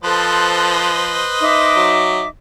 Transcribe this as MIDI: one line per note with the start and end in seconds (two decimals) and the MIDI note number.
0.03 1.25 53
0.03 0.89 69
0.03 2.11 71
0.03 2.11 72
0.03 2.11 75
0.03 0.89 90
1.41 2.27 63
1.41 2.27 76
1.41 2.27 86
1.76 2.23 54